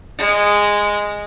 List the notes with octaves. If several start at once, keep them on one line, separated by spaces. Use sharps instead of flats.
G#3